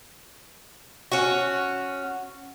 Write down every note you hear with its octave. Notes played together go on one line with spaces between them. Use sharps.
C#4 F#4